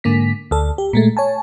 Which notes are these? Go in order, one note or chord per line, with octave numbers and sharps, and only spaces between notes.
G#2 D3 A#3 B6
D2 A4
G4
A#2 G#3 A3
C#5 G#5 A5